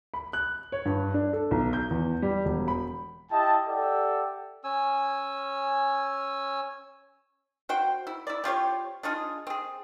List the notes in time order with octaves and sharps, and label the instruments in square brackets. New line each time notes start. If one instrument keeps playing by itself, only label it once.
[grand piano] B5
F#6
C#5
G2
D4
A4
B1
G6
E2
G3
E1
B5
[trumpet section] E4 G4 D#5 G5 A5
G4 A4 D5 E5 F#5 G5
[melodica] C#4 G#5 E6
[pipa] F#4 C5 G5
E4
E4 D5
C4 F4 G4 C#5
D4 D#4 F4 G#4
C4 G#4